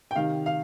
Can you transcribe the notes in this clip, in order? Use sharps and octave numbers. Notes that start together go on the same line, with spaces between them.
G5
C3 D#3 F5
F5